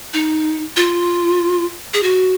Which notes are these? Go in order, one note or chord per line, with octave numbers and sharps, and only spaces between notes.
D#4
F4
G#4
F#4